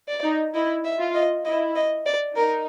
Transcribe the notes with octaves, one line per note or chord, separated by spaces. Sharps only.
D5
D#4
E4 D#5
E5
F4
D#5
E4 D#5
D#5
D5
D#4 A#4